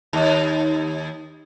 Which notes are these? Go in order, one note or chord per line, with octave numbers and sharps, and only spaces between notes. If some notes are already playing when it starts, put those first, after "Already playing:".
D#2